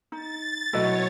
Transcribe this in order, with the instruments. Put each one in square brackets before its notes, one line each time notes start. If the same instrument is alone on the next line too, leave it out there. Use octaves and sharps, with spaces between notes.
[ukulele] D#4 [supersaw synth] A6
[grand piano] B2 F#3 A3 [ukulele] E4 D#5 [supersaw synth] C#5